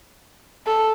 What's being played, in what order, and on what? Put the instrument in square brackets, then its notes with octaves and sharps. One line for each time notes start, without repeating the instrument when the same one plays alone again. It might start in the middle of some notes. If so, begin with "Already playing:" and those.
[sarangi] A4